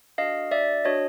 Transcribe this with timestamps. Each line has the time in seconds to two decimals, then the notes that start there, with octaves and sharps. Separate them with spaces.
0.18 D4 F#4 A4 D#5 F5
0.52 D5 E5
0.85 D4 F#4 A4 C#5 D#5